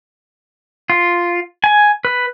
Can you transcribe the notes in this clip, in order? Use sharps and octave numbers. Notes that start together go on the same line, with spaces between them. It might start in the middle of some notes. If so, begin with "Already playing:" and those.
F4
G#5
B4